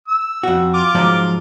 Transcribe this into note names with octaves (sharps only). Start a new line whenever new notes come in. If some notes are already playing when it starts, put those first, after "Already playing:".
E6
F2 F#4
F4 D6
G#2 F3 F#3